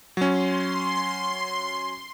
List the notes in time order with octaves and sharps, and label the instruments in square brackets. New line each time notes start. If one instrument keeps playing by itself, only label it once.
[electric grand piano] F#3 C#4 [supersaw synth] C6